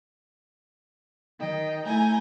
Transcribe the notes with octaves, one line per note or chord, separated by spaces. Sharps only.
D#3 D#5 G5
A3 E4 G#5 A#5 G6